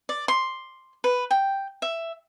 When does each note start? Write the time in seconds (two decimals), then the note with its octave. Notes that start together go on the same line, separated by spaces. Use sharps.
0.09 D5
0.28 C6
1.04 B4
1.31 G5
1.82 E5